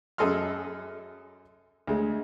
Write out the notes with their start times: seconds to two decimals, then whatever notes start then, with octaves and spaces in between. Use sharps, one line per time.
0.18 F#2 G#4 A4 D#5 C6 F6
1.87 D2 G#3